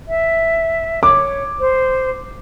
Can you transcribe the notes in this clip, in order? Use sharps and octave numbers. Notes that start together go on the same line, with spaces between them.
E5
C#5 D6
C5